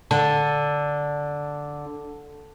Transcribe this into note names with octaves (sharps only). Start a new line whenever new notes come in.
D3 A5